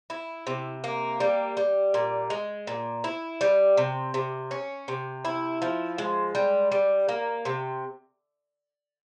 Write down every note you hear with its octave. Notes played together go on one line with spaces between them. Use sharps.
E4
C3
A#3
G3
G3
A#2
G#3
A#2
E4
G3
C3
C3
C#4
C3
E4
F3
G#3
G3
G3
A#3
C3